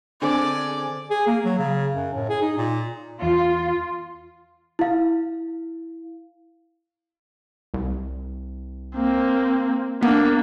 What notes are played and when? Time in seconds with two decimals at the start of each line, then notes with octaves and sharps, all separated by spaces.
0.22 D3 C4 D4 G#4 C5 D5 G#5
1.10 G#4
1.26 A#3
1.44 F#3
1.58 C#3
1.92 F#2
2.13 A2
2.29 G#4
2.41 D#4
2.57 A#2
3.22 E2 F4
4.79 E4 F5
7.74 C2
8.95 A#3 C4
10.02 A#3 B3 D4